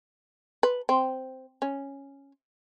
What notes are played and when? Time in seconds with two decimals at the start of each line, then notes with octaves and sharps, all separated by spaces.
0.63 B4
0.89 C4
1.62 C#4